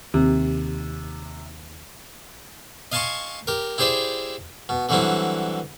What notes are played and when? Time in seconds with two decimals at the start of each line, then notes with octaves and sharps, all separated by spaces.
0.14 D#2 C3
2.92 D#5 F5 G#5 A5 C6 C#6
3.47 G4 A#4
3.78 E4 G4 G#4 C5 D5 E5
4.69 B2
4.89 D3 E3 F#3 G3 C4 E4